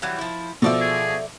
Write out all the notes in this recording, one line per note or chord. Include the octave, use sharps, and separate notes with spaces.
E3 F#3 G3
F3 E4
B2 F3 A4 D5 E5
G#4